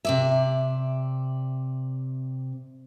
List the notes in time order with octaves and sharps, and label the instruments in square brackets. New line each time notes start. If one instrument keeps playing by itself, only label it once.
[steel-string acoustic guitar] C3 D5 E5